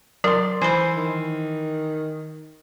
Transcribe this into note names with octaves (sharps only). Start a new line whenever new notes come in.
F#3 A#4 D5 C6
E3 C5 G#5 B5
D#3